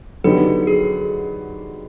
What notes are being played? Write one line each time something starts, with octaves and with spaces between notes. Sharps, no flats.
D3 F#3 B3 D#4 G4 A4
G#4